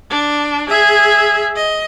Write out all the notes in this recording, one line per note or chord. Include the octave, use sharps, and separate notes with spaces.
D4
G#4 E5
D#5